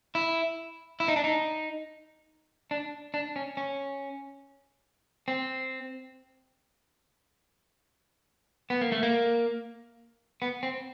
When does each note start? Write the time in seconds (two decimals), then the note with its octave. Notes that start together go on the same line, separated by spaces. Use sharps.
0.15 E4
1.00 E4
1.08 D#4
1.16 D4
1.24 D#4
2.71 D4
3.14 D4
3.36 C#4
3.57 C#4
5.28 C4
8.70 B3
8.81 A#3
8.92 A3
9.03 A#3
10.42 B3
10.63 C4